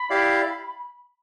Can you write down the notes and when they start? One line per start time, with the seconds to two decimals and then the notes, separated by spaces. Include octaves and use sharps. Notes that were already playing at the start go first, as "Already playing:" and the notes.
Already playing: B5
0.10 E4 G4 D5 F5